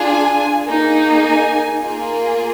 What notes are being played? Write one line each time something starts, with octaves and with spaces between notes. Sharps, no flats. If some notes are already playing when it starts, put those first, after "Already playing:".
Already playing: D4 F4 G#4
G#5
A#3 D#4 G#4
G#5
A#3 F4 G#4